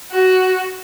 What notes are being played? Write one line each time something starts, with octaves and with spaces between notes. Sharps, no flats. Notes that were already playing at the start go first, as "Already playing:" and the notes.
F#4